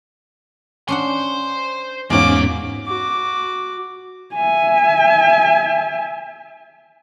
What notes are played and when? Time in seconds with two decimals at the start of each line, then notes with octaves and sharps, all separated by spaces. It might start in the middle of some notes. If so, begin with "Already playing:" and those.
0.88 C#4 D4 C5 F#5 C6
2.10 E2 G#2 G#3 A#3 C#4 F4 F#4 D6
2.87 F#4 D6
4.36 E5 G#5